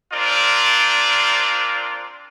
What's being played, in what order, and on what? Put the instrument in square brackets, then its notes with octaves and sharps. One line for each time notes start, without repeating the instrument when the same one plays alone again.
[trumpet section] C4 D4 F4 A#4 C5 D5